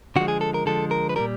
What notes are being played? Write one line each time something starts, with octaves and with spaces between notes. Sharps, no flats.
D3 F3 G#3 F#4
G#4
A4
A#4
D3 F3 G#3 A4
A#4
B4
A#2 G3 A#4